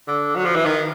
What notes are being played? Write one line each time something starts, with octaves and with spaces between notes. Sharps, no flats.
D3
F#3
F3
E3
D#3